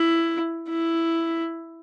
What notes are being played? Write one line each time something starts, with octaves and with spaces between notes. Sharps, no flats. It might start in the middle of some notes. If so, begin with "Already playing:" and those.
Already playing: E4
E4